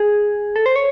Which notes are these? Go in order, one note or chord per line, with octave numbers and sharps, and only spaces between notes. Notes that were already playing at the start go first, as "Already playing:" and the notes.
Already playing: G#4
A4
C5
C#5